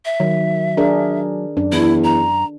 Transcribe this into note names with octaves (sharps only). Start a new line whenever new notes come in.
E5
D#3 F#3
D4 G#4 A#4
F#2 D4
E2 E4
A#5